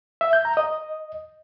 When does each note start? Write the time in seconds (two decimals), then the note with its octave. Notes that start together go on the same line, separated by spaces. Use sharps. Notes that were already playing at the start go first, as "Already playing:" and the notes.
0.21 E5
0.33 G6
0.45 A#5
0.57 D#5